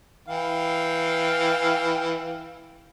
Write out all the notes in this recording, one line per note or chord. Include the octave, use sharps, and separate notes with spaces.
E3 F5 G5